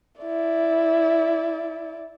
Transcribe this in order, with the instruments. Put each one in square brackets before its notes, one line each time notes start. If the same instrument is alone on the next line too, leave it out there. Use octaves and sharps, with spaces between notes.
[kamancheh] E4 D5